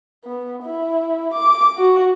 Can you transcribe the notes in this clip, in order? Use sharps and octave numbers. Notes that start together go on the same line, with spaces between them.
B3
E4
D6
F#4